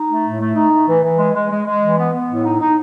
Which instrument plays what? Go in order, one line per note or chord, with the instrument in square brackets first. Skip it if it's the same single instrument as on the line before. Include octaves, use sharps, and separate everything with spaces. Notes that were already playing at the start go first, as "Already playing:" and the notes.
Already playing: [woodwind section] D#4
A3
A2
A3
D#4
A3
E3
E3
G#3
G#3
G#3
G#3
E3
B3
B3
A2
D#4
D#4